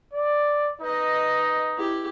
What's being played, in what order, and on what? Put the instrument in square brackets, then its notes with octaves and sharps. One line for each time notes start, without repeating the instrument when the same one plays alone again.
[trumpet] D5
[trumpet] D#4 [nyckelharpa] B4 D#5
[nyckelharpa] E4 G4